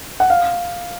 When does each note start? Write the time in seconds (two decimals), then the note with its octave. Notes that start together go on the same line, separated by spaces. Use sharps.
0.20 F#5
0.30 F5